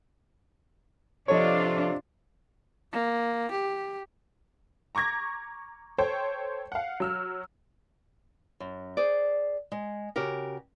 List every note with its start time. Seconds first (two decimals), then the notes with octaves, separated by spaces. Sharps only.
1.28 C3 F3 D4 F4 A4 C#5 D#5 C#6
2.92 A#3
3.51 G4
4.95 A#5 C#6 D6 G#6 A#6
5.98 A4 C5 C#5 G5
6.72 F5 F#5
7.00 F#3 E6 F6
8.60 F#2
8.97 G#4 C5 D5
9.72 G#3
10.16 C#3 F#4 G4 A#4